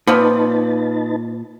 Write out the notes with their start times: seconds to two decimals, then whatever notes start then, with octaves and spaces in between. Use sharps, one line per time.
0.07 A#2 F3 B3 C4 D#4 B4 A5